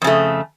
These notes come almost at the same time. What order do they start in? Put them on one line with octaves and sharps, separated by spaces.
F2 C#3 A3